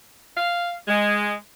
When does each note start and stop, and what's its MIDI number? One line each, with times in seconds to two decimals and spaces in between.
0.36 0.71 77
0.87 1.33 56